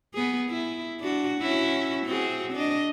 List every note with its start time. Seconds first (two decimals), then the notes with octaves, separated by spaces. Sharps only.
0.15 B3 G#4
0.50 E4
1.00 D4 F#4
1.41 C#4 E4 F#4
2.06 C4 F#4 G#4
2.53 D4 D#5